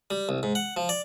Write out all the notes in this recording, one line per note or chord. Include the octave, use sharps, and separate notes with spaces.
G3
C2
G#2
F#5
F3
D5